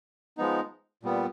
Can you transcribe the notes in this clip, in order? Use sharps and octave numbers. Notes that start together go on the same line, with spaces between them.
F3 G#3 B3 D#4
A#2 G3 B3